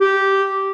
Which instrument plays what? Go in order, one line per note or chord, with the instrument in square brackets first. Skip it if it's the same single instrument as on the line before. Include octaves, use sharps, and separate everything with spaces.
[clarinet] G4